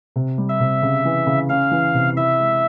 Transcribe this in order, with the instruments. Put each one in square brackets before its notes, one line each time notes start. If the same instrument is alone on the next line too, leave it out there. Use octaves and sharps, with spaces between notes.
[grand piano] C3
G3
[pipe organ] E5
[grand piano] C3
C#3
E3
C#3
[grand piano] C#4 [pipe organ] F5
[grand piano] E3
C3
[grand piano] E4 [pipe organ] E5
[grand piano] G#3